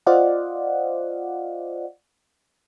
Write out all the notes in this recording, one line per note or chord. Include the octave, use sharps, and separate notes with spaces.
F4 C5 D5 D#5 F5 F#5